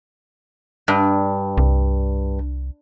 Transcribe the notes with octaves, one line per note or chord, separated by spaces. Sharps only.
G2
C2